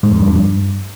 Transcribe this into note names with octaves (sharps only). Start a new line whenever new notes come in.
G#2
F2
G2
F2
G2